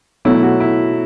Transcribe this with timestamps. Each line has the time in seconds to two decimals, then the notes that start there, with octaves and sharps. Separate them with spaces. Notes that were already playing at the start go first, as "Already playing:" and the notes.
0.25 B2 F#3 A3 E4
0.43 F#4
0.60 E4